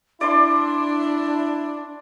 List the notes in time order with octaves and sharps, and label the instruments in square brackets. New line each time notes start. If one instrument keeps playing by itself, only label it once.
[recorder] D4 [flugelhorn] E4 [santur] D5 C6